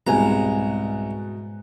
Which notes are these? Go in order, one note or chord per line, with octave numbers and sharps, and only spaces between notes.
C2 G#2 B2 G#3 B4 G#5 A#5 F#6